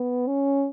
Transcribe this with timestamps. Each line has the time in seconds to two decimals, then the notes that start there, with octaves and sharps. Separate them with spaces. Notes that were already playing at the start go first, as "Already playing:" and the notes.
Already playing: B3
0.27 C#4